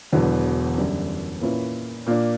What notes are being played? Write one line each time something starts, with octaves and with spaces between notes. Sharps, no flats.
E1 E2 D3 F#3 B3
F#2 D3 G3
A#2 A#3 C#4 E4 B4
A#2 A#3 D4